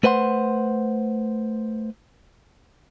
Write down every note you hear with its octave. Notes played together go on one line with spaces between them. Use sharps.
A3 B4 C5 F#5 C6